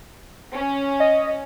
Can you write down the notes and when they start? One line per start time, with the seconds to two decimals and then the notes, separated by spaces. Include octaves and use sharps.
0.54 C#4
1.00 D#5